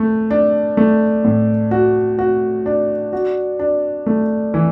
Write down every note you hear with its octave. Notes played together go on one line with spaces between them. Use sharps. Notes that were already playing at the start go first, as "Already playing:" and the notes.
Already playing: A3
D4
A3
A2
F#4
F#4
D4
F#4
D4
A3
E3